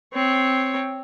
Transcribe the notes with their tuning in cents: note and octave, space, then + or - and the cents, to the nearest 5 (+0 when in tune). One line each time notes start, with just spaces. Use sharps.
C4 +0 C#5 +0